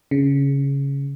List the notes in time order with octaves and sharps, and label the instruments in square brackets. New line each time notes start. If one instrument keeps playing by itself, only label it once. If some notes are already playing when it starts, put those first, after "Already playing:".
[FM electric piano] C#3